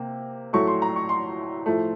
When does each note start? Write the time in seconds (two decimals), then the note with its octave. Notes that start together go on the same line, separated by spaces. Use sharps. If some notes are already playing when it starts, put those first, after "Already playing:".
Already playing: C3 A#3
0.53 A2 F#3 A3 C#6
0.67 C6
0.82 A#5
0.96 C#6
1.09 C6
1.66 A2 F3 A3